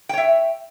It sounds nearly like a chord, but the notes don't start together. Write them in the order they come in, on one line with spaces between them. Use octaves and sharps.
G5 C#5 E5